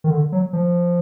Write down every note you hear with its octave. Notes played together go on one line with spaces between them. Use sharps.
D#3
D3
F#3
F3